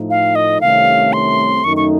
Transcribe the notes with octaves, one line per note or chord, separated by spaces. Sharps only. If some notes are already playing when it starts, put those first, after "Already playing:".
Already playing: A2 F3 A3 D#4
F5
D#5
C2 C3 D#3 A3 C#4 F5
C6
F#2 D#3 A3 D#4 C#6
C#6